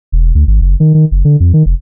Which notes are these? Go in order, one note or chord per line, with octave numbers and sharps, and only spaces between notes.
E1
D2
G#1
F#1
D#3
D#3
F#1
D3
F2
D#3
F1